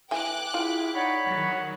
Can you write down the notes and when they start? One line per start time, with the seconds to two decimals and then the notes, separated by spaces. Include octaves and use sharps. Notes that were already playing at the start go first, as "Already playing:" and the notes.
0.11 E3 G5 G#5 D6 F#6
0.54 E4 F4 G#4
0.94 D#4 C#5 D5 F#5 B5
1.25 D#3 F#3 F#5 C#6